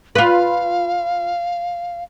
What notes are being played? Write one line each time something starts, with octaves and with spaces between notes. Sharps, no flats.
F4 B4 F5